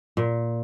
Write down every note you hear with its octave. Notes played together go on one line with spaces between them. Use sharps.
A#2